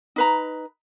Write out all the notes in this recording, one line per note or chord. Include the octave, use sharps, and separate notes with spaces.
D#4 B4 A#5